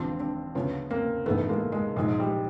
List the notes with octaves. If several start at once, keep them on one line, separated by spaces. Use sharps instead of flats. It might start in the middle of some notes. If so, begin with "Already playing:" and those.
Already playing: E1 D#2 D3 F3 C4 D4
C4 D4
D2 C#3 F3 B3 C#4
A#3 C4
A1 G2 D#3 A3 B3
G#3 A#3
G#3
A#1 G#2 D#3 G#3
G3